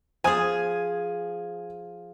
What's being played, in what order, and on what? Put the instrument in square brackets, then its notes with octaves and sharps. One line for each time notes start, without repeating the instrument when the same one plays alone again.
[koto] F3 G#4 [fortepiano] G#5 D#6